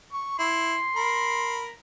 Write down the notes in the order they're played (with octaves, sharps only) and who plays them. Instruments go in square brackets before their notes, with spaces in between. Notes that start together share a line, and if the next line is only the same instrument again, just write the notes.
[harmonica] C#6
[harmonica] E4 [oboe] C6
[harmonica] A#4 B5